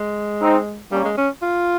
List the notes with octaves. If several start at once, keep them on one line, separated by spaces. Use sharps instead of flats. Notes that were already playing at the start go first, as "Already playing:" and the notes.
Already playing: G#3
C4 D#4
G3 A#3 C#4
G#3
C#4
F4